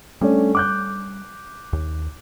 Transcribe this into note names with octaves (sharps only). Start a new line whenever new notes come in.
G3 A3 C#4 D4
D6 F#6 G6
D#2